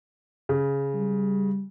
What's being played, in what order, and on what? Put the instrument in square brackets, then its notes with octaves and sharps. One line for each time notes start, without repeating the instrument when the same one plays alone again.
[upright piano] C#3
[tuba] G3